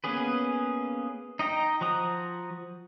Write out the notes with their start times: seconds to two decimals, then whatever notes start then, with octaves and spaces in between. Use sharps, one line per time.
0.04 A#3 B3 C#4 G#4 B4
1.39 D#4 D#5 G5 A#5
1.81 F3 F#4 C5 A#5 D#6